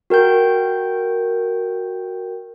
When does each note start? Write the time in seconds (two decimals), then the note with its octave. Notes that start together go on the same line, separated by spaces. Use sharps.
0.10 F#4 A#4 G5 G6